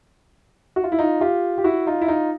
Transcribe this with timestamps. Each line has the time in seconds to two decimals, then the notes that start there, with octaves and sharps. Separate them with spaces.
0.76 F#4
0.84 F4
0.92 E4
0.99 D#4 F4
1.21 F4 G4
1.58 G4
1.64 E4 F#4
1.87 D#4 F4
2.01 E4
2.08 D#4 F4